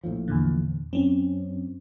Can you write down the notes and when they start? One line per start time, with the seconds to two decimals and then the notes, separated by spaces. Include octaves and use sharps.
0.04 A#1 A2 F3
0.28 E2 A#2 D3
0.93 F#2 C4 C#4